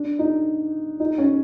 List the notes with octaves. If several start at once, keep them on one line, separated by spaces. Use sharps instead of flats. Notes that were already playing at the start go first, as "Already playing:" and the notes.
Already playing: D4
D#4
D#4
C#4